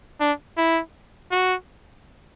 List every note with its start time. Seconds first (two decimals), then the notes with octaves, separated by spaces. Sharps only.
0.21 D4
0.58 E4
1.32 F#4